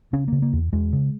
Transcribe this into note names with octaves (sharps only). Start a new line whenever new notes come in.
C#3 C#4
C#3 A#3
A#3
E2
E2 G#3
C#3